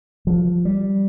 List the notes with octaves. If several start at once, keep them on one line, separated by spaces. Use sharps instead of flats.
F3
G3